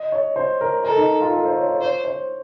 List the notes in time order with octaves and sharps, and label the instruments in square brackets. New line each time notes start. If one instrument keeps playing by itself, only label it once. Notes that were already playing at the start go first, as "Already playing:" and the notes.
Already playing: [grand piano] D#5
C#5
C5
A#4
[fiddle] A4 [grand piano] A#4
[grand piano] D#4
F4
A4
C5
C#5
C#5
[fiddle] C5 [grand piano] C#5
[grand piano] C5